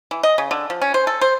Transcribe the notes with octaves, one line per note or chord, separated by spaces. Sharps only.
E3
D#5
C#3
D3
F3
C#4
C5
A4
C5